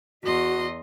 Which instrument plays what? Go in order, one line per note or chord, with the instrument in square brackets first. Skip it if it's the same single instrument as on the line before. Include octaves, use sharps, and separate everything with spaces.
[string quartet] E2 D#5 C6 [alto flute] F#4